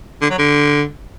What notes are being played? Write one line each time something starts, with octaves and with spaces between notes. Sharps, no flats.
D3
F#3
D3